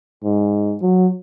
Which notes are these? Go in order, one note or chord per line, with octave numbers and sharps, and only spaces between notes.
G#2
F#3